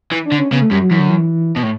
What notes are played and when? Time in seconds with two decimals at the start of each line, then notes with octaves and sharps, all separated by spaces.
0.12 E3
0.25 D4
0.32 D3
0.38 C#4
0.52 C#3 B3
0.61 A3
0.71 F#2 G3
0.81 F#3
0.91 F#2 E3
1.00 D3
1.10 E3
1.56 B2
1.63 A2